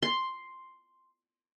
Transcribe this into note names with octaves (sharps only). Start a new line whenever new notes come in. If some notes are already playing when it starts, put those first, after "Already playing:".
C6